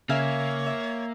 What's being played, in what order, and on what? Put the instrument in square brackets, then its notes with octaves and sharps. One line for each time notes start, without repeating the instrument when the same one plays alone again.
[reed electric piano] C#3 [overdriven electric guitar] A#3 [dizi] C#5 [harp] E5 F5 G#5
[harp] E5